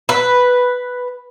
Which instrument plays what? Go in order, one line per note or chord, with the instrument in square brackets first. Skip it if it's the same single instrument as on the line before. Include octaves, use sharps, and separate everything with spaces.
[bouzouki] B4